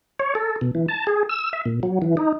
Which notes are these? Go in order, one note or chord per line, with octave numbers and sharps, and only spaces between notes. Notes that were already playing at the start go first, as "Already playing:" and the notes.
C#5
A4
B2
E3
A5
G#4
E6
E5
A#2
F#3
E3
D#4